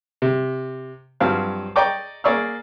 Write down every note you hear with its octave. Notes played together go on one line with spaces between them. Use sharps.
C3
G2 F3 F#3 C4 F5 F6
D5 D#5 G5 A#5 C#6 D6
A#3 G#4 D5 C#6 E6 F6